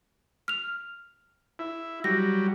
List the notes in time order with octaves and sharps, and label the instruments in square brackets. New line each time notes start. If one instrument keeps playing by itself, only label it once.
[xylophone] F6 F7
[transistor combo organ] E4
[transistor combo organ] F#3 G3 [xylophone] A#6